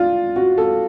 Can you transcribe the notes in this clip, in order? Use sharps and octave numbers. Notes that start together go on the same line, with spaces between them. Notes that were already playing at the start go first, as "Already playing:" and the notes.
Already playing: D4 F4
F#4
A4